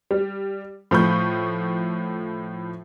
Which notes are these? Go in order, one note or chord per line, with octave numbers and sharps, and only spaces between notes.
G3
A2 F3 B5 C#6 G6